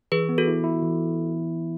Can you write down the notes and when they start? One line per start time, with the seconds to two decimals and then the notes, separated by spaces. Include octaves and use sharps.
0.12 E3 G#4 B4
0.29 B3
0.38 F#4 A4
0.47 E4
0.64 E4
0.82 E3